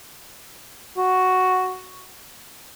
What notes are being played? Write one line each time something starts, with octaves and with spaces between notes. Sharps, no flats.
F#4